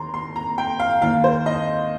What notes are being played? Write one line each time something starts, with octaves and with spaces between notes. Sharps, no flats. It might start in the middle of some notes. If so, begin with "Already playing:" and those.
Already playing: D#2 D#3 A#5 C6
C6
A#5
G5
F5
D#2 D#3 F5
C5
D#5